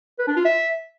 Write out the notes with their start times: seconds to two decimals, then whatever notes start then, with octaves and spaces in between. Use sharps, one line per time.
0.19 B4
0.28 D4
0.36 F4
0.45 E5